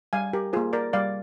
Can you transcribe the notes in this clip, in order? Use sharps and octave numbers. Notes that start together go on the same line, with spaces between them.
G3 F5 G#5
G4 A#4
A#3 F4 G#4 C5
A#4 D5
G3 D5 F5